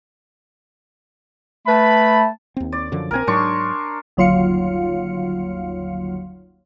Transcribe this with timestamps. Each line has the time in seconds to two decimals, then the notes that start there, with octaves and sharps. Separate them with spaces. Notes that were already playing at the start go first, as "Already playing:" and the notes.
1.67 A3 B4 A5 B5
2.56 D#2 C4
2.72 D5
2.92 F#2 D3 F3
3.11 A#1 D#3 C4 A#4 G#5
3.27 G#2 F#3 D4 C6 C#6
4.17 G1 D#2 F#3 F4 F5 C#7